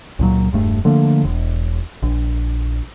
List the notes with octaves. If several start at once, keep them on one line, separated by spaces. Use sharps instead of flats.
C#2 A#2 F#3
E1 G2 A3
D3 F3 A3 A#3
E1
A#1